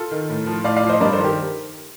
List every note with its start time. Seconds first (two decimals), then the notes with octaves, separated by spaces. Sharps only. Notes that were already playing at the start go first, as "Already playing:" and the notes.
Already playing: F4 A4
0.11 D#3
0.30 A2
0.46 F3
0.64 A2 D5 F5
0.76 D5 F5
0.84 F3
0.89 C5 D#5
1.00 G2 A#4 D5
1.13 A4 C5
1.19 D#3
1.24 G4 A#4